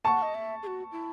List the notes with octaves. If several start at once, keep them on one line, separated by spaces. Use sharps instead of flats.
F#5 G#5 A5 C#6
D#5
E5
G#4
F#4
E4